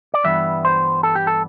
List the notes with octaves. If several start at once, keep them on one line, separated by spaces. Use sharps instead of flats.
D5
G2 E3 G3 B3 E5
C5
A4
G4
A4